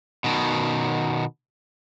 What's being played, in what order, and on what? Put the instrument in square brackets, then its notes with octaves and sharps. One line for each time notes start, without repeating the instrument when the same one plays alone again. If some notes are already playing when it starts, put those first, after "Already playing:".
[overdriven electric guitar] B2 D#3